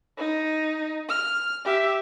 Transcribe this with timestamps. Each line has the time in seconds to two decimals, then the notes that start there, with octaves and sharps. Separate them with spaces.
0.18 D#4
1.09 F6
1.64 G4 E5